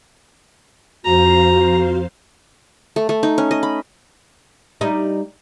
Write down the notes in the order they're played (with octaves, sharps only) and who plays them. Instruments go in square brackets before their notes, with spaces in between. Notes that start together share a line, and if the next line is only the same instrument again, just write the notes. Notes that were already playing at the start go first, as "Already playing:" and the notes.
[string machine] F2 C5 F5 [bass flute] F#4 [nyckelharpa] A#5
[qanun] A3
A3
D#4
C#4
D#5
B5
[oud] G3 D#4